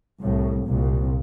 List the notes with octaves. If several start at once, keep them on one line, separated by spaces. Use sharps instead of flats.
C2 A2
C2 A#2